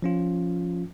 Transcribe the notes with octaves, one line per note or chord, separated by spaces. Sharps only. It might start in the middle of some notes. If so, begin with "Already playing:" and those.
F3 C#4 F4